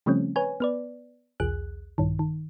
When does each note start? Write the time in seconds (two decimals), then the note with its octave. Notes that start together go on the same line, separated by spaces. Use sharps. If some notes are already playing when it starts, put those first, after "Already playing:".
0.06 C#3 F3 G3 A3 C4 C#4
0.36 B4 C#5 G#5
0.60 B3 B4 D5
1.40 B1 E2 G#4 F#6
1.98 A#1 G2 D#3
2.19 D#3